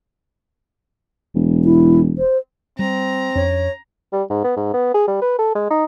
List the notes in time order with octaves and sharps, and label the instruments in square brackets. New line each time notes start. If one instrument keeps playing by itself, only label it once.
[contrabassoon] E1
[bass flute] E4
C5
[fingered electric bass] G3 [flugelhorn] C4 [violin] A#5
[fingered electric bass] F2 C#4 D4 [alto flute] C#5
[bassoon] G3
G#2
B3
G#2
B3
G#4
G3
B4
A4
G#3
D#4